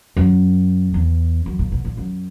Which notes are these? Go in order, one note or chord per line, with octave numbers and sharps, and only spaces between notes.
F#2
E2
F#2
A#2
B2
A#2
F#2